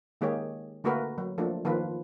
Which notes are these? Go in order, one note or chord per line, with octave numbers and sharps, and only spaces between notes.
D#3 G#3 A#3 G4 G#4 C#5
D3 A3 A#3 F#4 A#4 B4
F#3
F3 A3 A#3 D4
D#3 F3 A#3 F4 B4